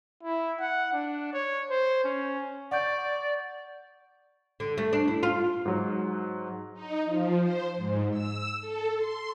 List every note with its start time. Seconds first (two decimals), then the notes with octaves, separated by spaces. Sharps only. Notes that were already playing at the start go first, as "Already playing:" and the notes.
0.23 E4
0.60 F#5
0.93 D4
1.33 C#5
1.70 C5
2.04 C#4
2.71 D5 F#5 C#6 G6
4.60 D3
4.78 A3
4.93 D4
5.08 E4
5.23 F4
5.65 G#2 F#3
6.74 D#4
7.05 F3
7.40 C5
7.77 G#2
8.10 E6
8.60 A4
8.95 C6